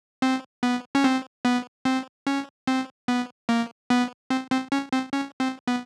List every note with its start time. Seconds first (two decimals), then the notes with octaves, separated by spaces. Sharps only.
0.22 C4
0.63 B3
0.95 C#4
1.04 C4
1.45 B3
1.85 C4
2.27 C#4
2.67 C4
3.08 B3
3.49 A#3
3.90 B3
4.30 C4
4.51 C4
4.72 C#4
4.93 C4
5.13 C#4
5.40 C4
5.68 B3